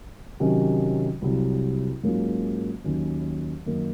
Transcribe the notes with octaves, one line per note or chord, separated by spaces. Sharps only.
C3 D#3 F#3 C#4
C2 C3 F#3
G#2 F#3 A#3 C#4 F4
D#2 D#3 F#3 C#4
F#2 D#3 A#3